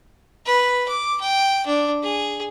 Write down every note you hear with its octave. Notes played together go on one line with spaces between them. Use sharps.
B4
D6
G5
D4
G#4